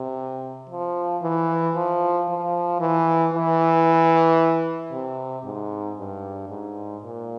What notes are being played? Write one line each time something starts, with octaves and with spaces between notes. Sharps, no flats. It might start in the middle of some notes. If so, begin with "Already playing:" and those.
Already playing: C3
F3
E3
F3
F3
E3
E3
C3
G#2
G2
G#2
A#2